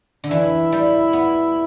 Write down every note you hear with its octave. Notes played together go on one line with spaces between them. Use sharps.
D3
E3 E4
G3
B3